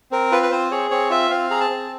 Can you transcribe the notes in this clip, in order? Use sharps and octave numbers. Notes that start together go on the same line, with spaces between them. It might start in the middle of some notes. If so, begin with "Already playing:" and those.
C4 A#4
F4 B4
B4
C4 C5
G#4 C#5
C4 C#5
F4 E5
C4 F5
G#4 A#5
A5
C4